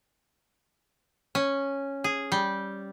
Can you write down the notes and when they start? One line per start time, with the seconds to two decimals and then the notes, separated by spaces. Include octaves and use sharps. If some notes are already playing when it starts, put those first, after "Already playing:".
1.35 C#4
2.04 G#4
2.32 G3